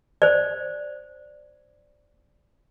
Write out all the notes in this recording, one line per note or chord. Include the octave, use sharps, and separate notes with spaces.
C5 D5